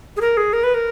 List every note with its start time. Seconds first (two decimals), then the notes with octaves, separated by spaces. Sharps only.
0.17 G#4
0.21 A#4
0.37 G#4
0.53 A#4
0.64 B4
0.74 A#4